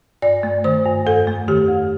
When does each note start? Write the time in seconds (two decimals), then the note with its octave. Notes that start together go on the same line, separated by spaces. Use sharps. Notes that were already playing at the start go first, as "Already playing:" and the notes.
0.22 G2 D5
0.43 A3
0.64 D#3 C5
0.86 G2
1.06 F2 A4
1.27 A3
1.48 D#3 G4
1.69 F2